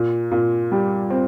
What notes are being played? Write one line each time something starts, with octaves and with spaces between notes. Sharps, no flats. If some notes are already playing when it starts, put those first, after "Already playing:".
Already playing: A#2
A#2
G3
C4